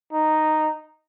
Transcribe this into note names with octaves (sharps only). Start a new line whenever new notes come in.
D#4